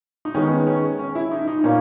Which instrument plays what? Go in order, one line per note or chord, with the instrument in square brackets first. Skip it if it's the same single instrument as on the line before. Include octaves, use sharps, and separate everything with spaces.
[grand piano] D#4
[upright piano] D#3 G#3 B3 [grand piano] C#4
[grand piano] C#4
C#4
E4
D#4
D#4
D#4
[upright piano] A#2 A#3 [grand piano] C#4